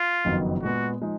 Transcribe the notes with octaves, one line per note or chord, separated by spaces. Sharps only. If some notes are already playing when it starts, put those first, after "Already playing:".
Already playing: F4
F#1 F2 D#3 F#3 B3
A#2 G#3 B3 F#4
F3 G#3 D#4